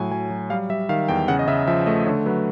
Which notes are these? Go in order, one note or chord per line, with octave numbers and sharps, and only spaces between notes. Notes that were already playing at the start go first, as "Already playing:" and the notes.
Already playing: A2 F#3 G#5
F#3 G#5
F#3
G3 F5
G3 E5
D#3 F5
E2 G5
C#3 F#5
D#5
C#3 E5
F3 E5
A3 D#5
D3 C#5
F#3 B4